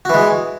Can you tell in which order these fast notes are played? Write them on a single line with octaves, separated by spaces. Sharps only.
F#4 E3 G#3